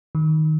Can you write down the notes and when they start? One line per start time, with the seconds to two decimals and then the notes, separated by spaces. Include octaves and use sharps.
0.15 D#3